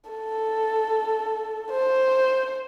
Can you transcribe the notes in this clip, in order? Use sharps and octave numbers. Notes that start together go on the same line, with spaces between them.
A4
C5